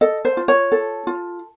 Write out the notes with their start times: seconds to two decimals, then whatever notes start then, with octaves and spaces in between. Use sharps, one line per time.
0.01 A4 D#5
0.25 C5
0.37 F4
0.48 C#5
0.72 A4
1.07 F4